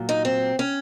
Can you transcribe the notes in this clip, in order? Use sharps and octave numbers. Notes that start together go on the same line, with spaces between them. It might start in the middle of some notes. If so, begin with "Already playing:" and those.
Already playing: A#2 F#3
D#4
C4
C#4